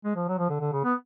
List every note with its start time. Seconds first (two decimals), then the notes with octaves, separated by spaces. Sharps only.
0.04 G#3
0.15 F3
0.28 F#3
0.38 F3
0.50 D3
0.60 D3
0.72 C#3
0.84 B3